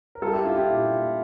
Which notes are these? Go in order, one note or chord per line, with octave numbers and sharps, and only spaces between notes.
A#4
G3 F4 A4
E4 G4
D4 F4
E4 G4
A#2
A#2